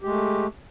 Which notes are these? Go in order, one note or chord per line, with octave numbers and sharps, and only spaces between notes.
G#3 A3 G4